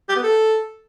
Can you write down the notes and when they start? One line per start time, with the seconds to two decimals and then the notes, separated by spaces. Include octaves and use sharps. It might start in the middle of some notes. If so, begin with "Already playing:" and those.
0.09 G4
0.16 B3
0.23 A4